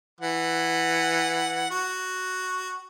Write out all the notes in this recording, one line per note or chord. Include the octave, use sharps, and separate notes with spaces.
E3 F#5
F#4